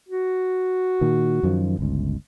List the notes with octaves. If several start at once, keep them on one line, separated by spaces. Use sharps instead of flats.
F#4
A#2 D#3
F#2 D#3 F3
G1 C#2